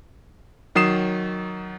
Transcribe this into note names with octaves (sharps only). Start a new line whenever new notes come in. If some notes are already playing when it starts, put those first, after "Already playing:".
D#3 F#3 D#6 C7 E7